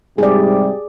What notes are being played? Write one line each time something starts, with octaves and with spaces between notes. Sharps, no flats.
G#2 C3 G3 G4 G#4 D5